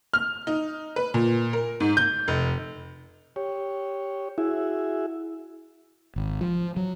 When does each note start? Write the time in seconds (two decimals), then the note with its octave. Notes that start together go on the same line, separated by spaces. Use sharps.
0.13 F6
0.47 D#4
0.96 B4
1.14 A#2
1.53 A#4
1.80 G#2
1.97 G6
2.28 F1
3.36 G4 C#5
4.38 E4 F#4 G#4 E5
6.16 G#1
6.41 F3
6.77 F#3